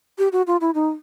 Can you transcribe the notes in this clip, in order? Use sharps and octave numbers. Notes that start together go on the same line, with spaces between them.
G4
F#4
F4
E4
D#4